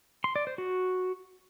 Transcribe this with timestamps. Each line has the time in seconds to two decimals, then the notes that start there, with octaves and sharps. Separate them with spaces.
0.24 C6
0.36 D5
0.47 C5
0.58 F#4